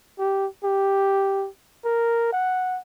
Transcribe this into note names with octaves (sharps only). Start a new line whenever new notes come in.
G4
G4
A#4
F#5